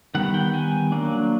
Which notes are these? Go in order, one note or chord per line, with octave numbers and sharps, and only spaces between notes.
D#3 G3 B3 F#5
G5
G#5
F#3 A#3 D4